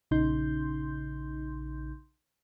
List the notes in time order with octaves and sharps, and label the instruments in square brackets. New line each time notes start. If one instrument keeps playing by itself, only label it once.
[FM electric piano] A#1 C#3 D#4 C6 G6